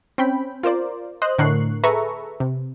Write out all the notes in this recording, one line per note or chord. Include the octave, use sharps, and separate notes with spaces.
C4 C#4 G5 B5
F4 A#4 C5 D5
C5 D#5 F#6
A2 D3 A#4 C#6 F#6 C7
G#4 A4 B4 E5 A#5 C#6
C3